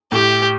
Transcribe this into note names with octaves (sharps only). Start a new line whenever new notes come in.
A2 G4